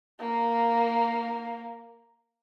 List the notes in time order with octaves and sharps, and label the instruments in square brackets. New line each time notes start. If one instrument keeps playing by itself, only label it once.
[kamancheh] A#3 F5